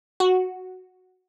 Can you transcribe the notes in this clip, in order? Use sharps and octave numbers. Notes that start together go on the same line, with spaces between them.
F#4